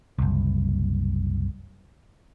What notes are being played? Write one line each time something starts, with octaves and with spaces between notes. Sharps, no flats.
F#1 C2